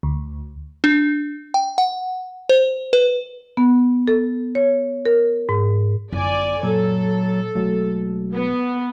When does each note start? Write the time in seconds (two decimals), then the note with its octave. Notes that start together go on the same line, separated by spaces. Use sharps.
0.03 D2
0.84 D4
1.54 G5
1.78 F#5
2.49 C5
2.93 B4
3.57 B3
4.08 A4
4.55 C#5
5.05 A#4
5.49 G#2
6.12 G1 F#2 E4 D5 G#5
6.63 A#2 F#3 A4
7.55 E1 F#3 A3 A#3
8.33 B3